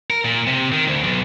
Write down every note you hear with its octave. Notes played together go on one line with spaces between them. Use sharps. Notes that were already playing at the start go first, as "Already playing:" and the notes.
A#4
A#2
C3
D#3
D2
B1